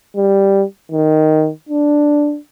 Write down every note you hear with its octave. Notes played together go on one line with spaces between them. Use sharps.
G3
D#3
D4